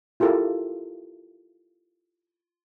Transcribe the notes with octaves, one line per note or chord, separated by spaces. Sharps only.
E4 F4 G4 A4 A#4